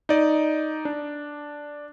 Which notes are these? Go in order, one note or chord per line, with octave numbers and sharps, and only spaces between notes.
D#4 D5 D#5
D4